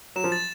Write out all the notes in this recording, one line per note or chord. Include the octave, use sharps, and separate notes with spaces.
F#3 E7
F3
A6